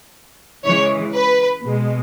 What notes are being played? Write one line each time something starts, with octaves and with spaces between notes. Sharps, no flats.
C#3 E3 G#3 C#5
B4
B2 G#3